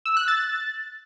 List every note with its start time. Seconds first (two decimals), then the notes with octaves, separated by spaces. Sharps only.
0.05 E6
0.17 F#6
0.28 A6